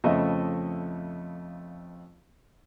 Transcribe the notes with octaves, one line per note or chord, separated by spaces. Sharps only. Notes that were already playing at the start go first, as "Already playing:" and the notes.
F2 C#3 F3 A3 D#5 E5